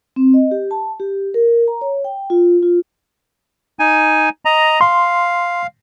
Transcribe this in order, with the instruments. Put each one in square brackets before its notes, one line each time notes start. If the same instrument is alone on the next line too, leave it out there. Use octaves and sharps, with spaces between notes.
[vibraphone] C4
D#5
G4
A5
G4
A#4
A#5
C#5
G5
F4
F4
[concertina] D#4 G#5
D#5 A#5
[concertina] F5 [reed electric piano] C6